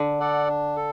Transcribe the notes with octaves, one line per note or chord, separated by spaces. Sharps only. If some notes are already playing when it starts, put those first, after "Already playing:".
Already playing: D3
A4 D5 F#5
D4
A4